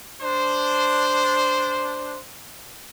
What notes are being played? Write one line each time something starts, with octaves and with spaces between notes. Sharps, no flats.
D4 C5